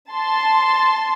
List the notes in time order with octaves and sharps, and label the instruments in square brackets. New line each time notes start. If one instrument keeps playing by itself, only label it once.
[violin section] A5 C6